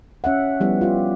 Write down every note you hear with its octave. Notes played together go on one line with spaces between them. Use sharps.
C#4 E5 F#5
F3 G3 B3 E4
F4 G4